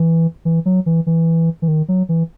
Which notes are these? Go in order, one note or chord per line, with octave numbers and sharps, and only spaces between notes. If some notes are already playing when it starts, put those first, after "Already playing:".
Already playing: E3
E3
F#3
E3
E3
E3
D#3
F#3
E3